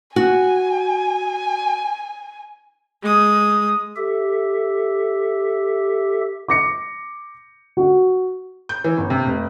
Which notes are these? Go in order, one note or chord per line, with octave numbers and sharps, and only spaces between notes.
F#4 G#5
G#3 D#6
G4 A4 E5
D6 A#6 C#7
F#4
G6
E3
G1
C3
F1